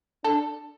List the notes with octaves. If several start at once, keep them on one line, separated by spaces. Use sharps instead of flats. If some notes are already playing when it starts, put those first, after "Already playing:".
D4 A4